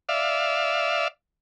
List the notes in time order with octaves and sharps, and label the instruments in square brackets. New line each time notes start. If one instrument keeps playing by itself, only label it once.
[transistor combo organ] D5 E5 F5